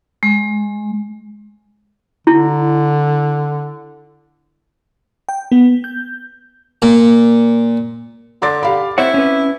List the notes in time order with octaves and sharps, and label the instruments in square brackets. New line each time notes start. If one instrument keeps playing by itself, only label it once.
[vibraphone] G#3
[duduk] D3 [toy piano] E4
[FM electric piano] G5
B3
G6
[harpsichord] A#2
[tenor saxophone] D3 [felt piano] C6 D6 A6
[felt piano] G4 F5 B5
[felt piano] C4 [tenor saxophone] E4 [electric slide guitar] C5 C#5 F#5
[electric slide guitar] C#4 B4